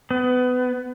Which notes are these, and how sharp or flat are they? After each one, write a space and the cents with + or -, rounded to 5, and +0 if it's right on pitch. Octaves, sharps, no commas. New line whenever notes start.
B3 +25